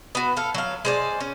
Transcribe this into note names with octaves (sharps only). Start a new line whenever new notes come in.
B3 F#4
A4 F5
F#3 F5
G#3 C5 D5
C#4